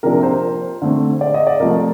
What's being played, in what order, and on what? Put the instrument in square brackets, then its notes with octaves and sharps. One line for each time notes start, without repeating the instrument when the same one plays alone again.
[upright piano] C3 F3 A#3 D4 A#4
C5
D3 A3 C4
D5
D#5
D5
C3 F3 A3 A#4